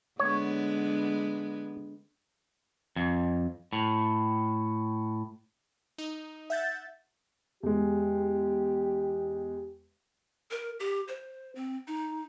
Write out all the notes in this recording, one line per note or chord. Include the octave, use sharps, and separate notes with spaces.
D3 G#3 B3 C#5
F2
A2
D#4
E5 F#5 G6 A6
E2 G#3 G4
A#4
G4
C5
C4
D#4